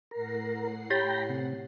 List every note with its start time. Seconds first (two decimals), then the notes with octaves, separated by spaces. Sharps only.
0.11 A2 A#4 F#5 C7
0.90 G4 C#5 G5 A#5 B5 A6
1.29 C3